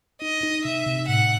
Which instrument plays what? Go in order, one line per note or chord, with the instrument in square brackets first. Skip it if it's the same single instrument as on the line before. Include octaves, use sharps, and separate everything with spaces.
[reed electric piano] D#4 [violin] D#5
[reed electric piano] D#4
[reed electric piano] C3 [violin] E5
[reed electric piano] C3
[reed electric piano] A2 [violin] F#5